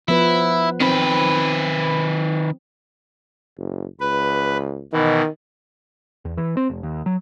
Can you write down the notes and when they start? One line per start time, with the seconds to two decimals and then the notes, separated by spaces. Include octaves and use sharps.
0.08 F3 B3 E4 B4
0.80 D#3 C4 B4
3.57 F#1
4.00 C#2 B4
4.93 B2 D#3 E3
6.25 E2
6.37 E3
6.57 C4
6.70 F1
6.83 D#2
7.06 F#3